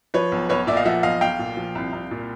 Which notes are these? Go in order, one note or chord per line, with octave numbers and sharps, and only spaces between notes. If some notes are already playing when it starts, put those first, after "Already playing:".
F3 B4 C#5
B1
B1 B4 C#5
A#2 D5 E5
D#5 F5
F3 E5 F#5
B1 D#5 F5
B1 F5 G5
A#2
F3
C2
C2
A#2